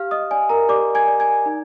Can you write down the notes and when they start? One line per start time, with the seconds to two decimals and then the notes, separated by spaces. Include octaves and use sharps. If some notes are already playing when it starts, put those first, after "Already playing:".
Already playing: G4 F5 F6
0.11 D#5 D#6
0.31 D5 G#5
0.49 A#4 A#5
0.69 G4 D5 D6
0.95 G#5 G#6
1.08 D5
1.20 G#5 G#6
1.46 D#4